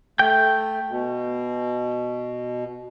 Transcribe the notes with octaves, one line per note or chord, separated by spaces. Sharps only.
A3 G5 G6
B2